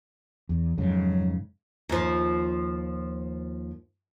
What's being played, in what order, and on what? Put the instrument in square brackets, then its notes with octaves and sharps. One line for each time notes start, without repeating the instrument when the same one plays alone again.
[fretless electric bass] E2
[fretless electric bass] F2 G#2 C#3 [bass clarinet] F#3
[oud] D#2 F3